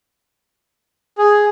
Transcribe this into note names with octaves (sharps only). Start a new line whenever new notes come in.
G#4